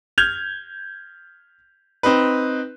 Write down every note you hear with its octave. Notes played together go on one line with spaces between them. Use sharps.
F6 G6 G#6 F7
C4 D#4 B4